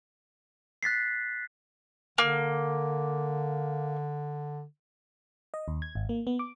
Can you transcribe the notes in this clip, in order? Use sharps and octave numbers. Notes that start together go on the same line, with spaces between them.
F#6 A6 B6 C7
D3 A#3
D#5
D#2
G#6
G#1
A#3
B3
D6